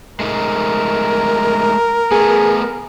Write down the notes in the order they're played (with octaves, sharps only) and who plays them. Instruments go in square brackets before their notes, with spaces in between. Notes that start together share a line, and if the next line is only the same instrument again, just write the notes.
[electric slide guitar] G#3 A3 D#4 [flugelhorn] A#4
[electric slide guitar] A3 B3 [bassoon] G#4